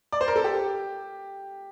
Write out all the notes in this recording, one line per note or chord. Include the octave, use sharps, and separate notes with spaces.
D5
C5
A#4
A4
G4